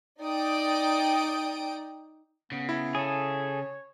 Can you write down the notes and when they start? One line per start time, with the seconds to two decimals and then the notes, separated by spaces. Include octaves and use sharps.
0.22 D#4 D5 G5 D#6 D7
2.52 C#3 B3
2.69 E4
2.95 G#4 A4 C#5